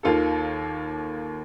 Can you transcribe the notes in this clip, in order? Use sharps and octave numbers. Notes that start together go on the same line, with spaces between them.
D#2 D#3 A#3 F4 A4